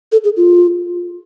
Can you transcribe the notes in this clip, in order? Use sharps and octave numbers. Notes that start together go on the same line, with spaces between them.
A4
G#4
F4